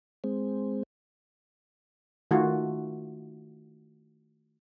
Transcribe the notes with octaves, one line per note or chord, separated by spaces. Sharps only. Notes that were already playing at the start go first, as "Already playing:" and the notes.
G#3 C4
D#3 A3 F4 F#4